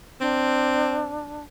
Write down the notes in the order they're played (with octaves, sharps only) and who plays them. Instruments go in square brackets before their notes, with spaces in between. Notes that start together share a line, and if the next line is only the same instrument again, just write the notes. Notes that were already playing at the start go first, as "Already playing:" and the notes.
[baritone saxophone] C4 [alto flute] D4